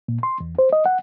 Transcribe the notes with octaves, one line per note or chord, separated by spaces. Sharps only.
A#2
C6
E2
C5
D#5
F#5